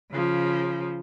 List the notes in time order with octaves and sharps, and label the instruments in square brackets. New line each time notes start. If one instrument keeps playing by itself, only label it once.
[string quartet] C#3 F3